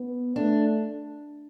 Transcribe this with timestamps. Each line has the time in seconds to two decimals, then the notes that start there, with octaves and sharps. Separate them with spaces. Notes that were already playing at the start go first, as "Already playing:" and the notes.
Already playing: B3
0.36 A3 D4